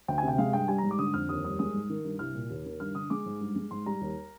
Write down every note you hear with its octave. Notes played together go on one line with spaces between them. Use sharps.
D2 G5
G#5
C3
G5
G#3 F5
G2 G5
G3 G#5
A#5
G#2
D6
D3 D#6
F2 F6
D#2 D#6
G3 D#6
G#3 D#6
G#2
D#3
G2
C2 F6
A#2
D#2
D#3
G2 F6
D3 D#6
G#3 D6
G#2
G2
G#3
G#2 C6
G3 A#5
D#2